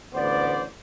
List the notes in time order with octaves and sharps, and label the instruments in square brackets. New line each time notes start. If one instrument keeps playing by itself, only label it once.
[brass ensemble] A1 D2 B3 C5 D5